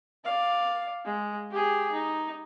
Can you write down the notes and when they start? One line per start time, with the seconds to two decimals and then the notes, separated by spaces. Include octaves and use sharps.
0.25 D5 F5
1.05 G#3
1.51 G4 G#4
1.92 D#4